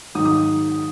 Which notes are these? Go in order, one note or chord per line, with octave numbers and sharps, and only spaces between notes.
G#2 D#3 F#3 D#6
D#6